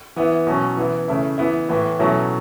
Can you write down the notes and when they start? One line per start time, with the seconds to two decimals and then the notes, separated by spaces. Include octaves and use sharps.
0.16 E3 B3 E4
0.47 B2 F#3 C#4
0.77 E3 B3 E4
1.08 C#3 A3 E4
1.38 E3 B3 E4
1.69 A2 E3 B3 E4
1.99 B2 F#3 A3 C#4 E4